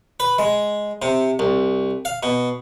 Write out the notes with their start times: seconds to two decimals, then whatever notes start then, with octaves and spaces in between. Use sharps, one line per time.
0.20 B4
0.38 G#3
1.02 C3
1.39 C2
2.05 F5
2.23 B2